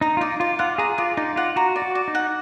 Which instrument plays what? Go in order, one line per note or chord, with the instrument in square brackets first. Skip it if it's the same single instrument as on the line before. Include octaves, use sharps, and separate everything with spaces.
[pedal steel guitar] D#4 [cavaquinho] A#5
[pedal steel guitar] F4
[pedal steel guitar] D#4 [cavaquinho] D5
[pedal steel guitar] F4 [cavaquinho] D5
[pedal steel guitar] F4 [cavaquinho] F#5
[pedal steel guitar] G#4 [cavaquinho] A#5
[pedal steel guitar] F4 [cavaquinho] D5
[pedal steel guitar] D#4 [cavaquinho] D5
[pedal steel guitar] F4 [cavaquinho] F#5
[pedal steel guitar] F#4 [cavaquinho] A#5
[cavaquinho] D5
[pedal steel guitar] F#4
[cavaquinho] D5
[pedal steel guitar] D#4
[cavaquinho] F#5